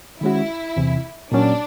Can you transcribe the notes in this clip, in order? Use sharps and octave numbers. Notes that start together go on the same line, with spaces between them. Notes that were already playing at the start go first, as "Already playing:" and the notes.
D#3 G#3 C#4 E4 F#4
E2 C3 E3
A#2 F#3 A#3 C#4 D4 F#4